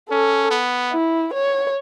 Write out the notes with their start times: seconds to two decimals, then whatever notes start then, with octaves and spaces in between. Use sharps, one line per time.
0.10 C#4 A4
0.51 B3
0.92 E4
1.33 C#5